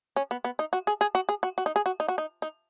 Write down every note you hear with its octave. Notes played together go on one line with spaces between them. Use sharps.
C#4
B3
B3
D#4
F#4
G#4
G#4
F#4
G#4
F#4
F#4
D#4
G#4
F#4
D#4
F#4
D#4
D#4